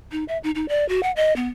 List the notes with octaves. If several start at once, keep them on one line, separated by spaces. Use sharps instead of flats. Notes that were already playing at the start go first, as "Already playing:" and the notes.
D#4
E5
D#4
D#4
D5
F#4
F#5
D#5
B3